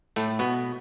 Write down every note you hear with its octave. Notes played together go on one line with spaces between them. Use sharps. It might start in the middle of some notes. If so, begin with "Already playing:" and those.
A2 A3
B2 B3